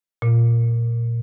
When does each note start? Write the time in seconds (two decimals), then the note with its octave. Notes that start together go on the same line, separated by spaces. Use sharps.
0.22 A#2